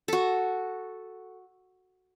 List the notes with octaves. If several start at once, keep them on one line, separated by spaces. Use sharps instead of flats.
F#4 A4